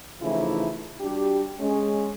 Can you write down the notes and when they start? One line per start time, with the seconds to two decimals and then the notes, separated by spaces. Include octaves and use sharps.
0.22 C#3 E3 F3 A3 D#4 E4
1.01 G3 D4 F#4 G4
1.60 G#3 C#4